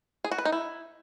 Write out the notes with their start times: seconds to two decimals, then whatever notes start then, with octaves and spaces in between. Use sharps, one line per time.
0.24 G#4
0.31 F#4
0.38 B4
0.45 D#4
0.52 E4